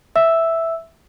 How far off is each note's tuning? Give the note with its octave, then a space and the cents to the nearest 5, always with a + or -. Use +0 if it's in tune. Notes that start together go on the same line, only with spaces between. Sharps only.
E5 +0 E6 +0